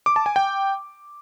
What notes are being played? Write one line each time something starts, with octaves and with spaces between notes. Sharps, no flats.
D6
A5
G#5
G5